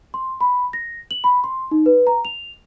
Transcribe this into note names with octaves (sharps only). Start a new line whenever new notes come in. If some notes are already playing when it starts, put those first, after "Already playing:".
C6
B5
A#6
F#7
B5
C6
D#4
B4
A#5
F7